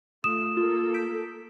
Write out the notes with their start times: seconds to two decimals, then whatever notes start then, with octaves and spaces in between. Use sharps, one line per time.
0.24 A3 F4 D#6 E7
0.57 A#3 F4 A4
0.94 G6 B6 D7